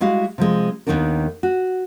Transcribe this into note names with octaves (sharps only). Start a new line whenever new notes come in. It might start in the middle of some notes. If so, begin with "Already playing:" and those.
G3 G#3 E4 F#4 F5
C3 F3 G#3
D#2 A#2 D#3 B3 D4 A#4
F#4